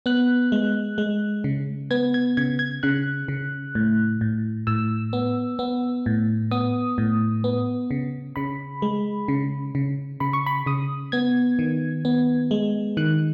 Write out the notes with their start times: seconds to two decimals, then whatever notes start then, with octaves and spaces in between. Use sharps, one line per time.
0.06 B3 F#6
0.52 G#3
0.98 G#3
1.44 C#3
1.91 B3 G#6
2.14 G#6
2.37 C#3 G#6
2.59 G#6
2.83 C#3 F#6
3.28 C#3
3.75 A2
4.21 A2
4.67 A2 E6
5.13 B3
5.59 B3
6.06 A2
6.51 B3 D#6
6.98 A2
7.44 B3
7.91 C#3
8.36 C#3 B5
8.82 G#3
9.28 C#3
9.75 C#3
10.20 C#3 B5
10.33 C#6
10.46 B5
10.66 C#3 D#6
11.12 B3 G#6
11.59 D#3
12.05 B3
12.51 G#3
12.97 D#3 F#6